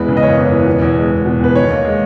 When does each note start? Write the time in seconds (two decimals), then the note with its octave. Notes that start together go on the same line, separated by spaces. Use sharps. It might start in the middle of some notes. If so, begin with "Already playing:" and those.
Already playing: E2 E3 G#3 B4
0.08 C#3
0.17 D#5
0.23 F#1 C#5
0.38 E2
0.52 E3
0.66 B2
0.82 E2
0.97 G#3
1.11 E2
1.25 B2
1.40 E2 B4
1.55 D#3 C#5
1.70 D#2
1.85 G#3